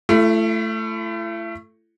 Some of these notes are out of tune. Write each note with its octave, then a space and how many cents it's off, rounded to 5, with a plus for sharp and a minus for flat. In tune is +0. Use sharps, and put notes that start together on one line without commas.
A3 +0 E4 +40